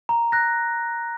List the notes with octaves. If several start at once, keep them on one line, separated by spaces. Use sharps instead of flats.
A#5
F#6 A#6